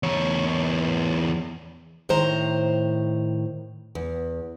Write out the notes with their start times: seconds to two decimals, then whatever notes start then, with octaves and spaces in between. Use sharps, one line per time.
0.03 E2 C#5
2.09 A2 D#3 C5 A#5
3.95 E2